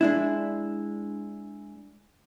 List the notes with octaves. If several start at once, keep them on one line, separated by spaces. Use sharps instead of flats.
G#3 D4 E4